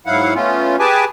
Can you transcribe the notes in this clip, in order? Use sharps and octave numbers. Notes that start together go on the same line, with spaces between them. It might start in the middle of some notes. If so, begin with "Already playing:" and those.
G#2 F#3 E4 F5 F#5
A3 B3 C#4 F4
G4 G#4 B4 G#5 A5 D6